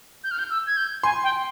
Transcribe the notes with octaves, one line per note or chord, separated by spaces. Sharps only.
G6
F6
G6
E6
G#6
G6
G#5 C6
G5